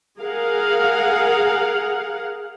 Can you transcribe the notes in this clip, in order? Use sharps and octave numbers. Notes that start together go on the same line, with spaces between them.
G#4 A#4 F5 F#5